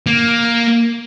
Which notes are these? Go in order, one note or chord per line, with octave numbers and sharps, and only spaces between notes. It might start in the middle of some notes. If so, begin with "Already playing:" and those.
A#3